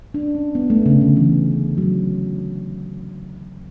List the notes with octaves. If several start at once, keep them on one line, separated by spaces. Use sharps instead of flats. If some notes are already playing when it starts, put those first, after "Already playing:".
D4
C#4
B3
A3
C#3
D3
E3
F#3